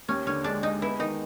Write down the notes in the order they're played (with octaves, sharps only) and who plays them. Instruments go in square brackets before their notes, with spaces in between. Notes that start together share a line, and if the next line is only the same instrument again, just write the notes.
[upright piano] D#2 [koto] C#4
[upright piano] D3 [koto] C#4
[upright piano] G#3 [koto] D4
[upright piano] G#3 [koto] D#4
[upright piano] B3 [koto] E4
[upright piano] D#3 [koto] D#4